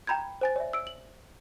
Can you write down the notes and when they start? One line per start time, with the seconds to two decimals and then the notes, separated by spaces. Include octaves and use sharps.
0.07 G5 A#5 B5 G6 G#6
0.41 C5 G#5 A6
0.56 C#5 D5 E5
0.73 E6 D7
0.87 F#7